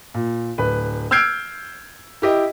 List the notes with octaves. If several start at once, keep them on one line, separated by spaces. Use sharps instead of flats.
A#2
D1 B4
E6 F6 G6 G#6 C7 D7
E4 G4 D#5